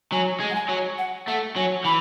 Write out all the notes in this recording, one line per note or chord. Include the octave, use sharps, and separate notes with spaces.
F#3 G#5
G#3
F#5
G#5
F#3
F#5
A3 F#5
F#3 G#5
E3 B5